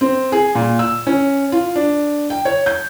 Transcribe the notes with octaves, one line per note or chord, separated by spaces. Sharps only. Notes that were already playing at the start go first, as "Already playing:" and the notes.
C4
G#4
A#2
E6
C#4
F4
D4
G5
C#5
G6